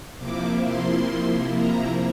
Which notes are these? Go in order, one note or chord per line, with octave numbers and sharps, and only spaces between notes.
C3 F3 A#3 E4 D6
C6
A#5